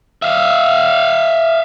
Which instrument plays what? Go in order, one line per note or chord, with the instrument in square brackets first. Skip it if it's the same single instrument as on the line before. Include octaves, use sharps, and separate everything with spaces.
[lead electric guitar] E5 F5